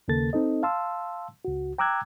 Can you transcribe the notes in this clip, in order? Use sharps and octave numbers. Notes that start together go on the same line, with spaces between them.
D#2 C#3 A#3 A4 A6
C4 D#4 A4 D#5
F5 A5 C6 E6
C#2 F#4
G5 A#5 D6 E6 F#6 G#6